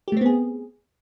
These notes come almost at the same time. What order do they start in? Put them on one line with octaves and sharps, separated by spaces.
G4 A3 C4 B3 G#4